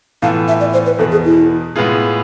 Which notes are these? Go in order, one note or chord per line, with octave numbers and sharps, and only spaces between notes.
A2 E3 B3 F4 A4 F5
E5
D5
C5
B4
E2 B2 B3 A4
G#4
E4
A2 G#3 B3 F4 G#4